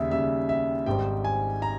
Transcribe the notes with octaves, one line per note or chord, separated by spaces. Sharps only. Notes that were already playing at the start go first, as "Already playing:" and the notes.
Already playing: D#2 C#3 G3 E5
D#2 C#3 G3 E5
E5
G#1 G#2 G3 G5
G#5
A#5